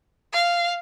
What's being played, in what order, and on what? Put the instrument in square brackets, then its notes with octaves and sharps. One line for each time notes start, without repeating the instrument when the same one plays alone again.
[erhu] F5